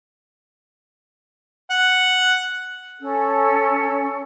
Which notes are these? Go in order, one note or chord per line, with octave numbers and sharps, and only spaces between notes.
F#5
C#4 A4